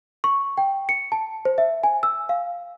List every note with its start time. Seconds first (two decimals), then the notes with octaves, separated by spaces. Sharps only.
0.24 C#6
0.58 G5
0.89 C#7
1.12 A5
1.45 C5
1.58 E5
1.83 G#5
2.03 E6
2.29 F5